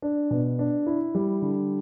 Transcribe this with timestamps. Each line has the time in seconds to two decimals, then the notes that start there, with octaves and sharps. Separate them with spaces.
0.02 D4
0.31 B2
0.59 D4
0.87 E4
1.15 G3
1.42 D3